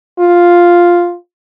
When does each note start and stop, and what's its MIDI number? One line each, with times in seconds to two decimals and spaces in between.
0.20 1.15 65